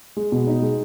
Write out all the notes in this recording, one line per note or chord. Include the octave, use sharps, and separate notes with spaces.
G#3
B2
D#4
G#3